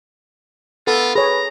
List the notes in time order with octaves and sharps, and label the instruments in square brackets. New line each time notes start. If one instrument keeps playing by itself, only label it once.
[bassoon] B3 [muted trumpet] F4 [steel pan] A4
[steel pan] G#4 C#5 [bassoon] B4 [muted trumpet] A#5